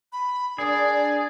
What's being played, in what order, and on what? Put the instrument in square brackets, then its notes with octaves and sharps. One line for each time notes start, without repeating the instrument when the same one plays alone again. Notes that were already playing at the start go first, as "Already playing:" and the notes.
[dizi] B5
[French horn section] D4 A#4 [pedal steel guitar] G#4 [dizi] D5